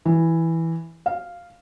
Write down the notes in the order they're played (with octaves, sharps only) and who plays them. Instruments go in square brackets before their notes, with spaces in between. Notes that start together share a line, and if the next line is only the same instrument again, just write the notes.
[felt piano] E3
F5